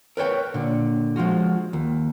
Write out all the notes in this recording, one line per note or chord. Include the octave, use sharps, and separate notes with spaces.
A#4 B4 C#5 G5
A#2 D3
F3 G#3 F4 F#4
D#2